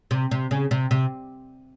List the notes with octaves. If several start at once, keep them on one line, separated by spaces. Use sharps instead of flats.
C3
C3
C#3
C3
C3